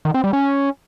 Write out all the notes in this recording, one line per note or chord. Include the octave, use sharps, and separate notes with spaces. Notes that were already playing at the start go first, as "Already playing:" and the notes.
D#3
C4
G3
C#4